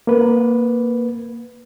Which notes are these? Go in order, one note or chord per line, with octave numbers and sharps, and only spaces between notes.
A#3 B4